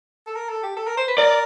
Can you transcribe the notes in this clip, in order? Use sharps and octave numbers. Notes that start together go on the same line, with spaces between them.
A4
A#4
A4
G4
A4
A#4
C5
B4
A#4 D5